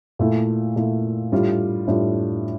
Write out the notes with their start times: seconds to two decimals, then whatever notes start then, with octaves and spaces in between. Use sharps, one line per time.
0.19 A#2 A3 E4
0.76 A#2 A3 E4
1.32 A2 G3 D4 F4
1.87 A2 G3 D4 F4